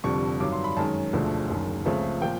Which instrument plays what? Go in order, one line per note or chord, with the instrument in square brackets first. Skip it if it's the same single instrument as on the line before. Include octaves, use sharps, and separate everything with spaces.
[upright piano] F1 F2 D3 G3 C#6
G2 D#3 F#3 D6
C6
B5
F#2 D#3 G#3 C#4 A5
E1 D2 D3 F3 A3
F#1 F#2 D#3
C#2 C#3 F3 A3 C4
A#2 F3 G5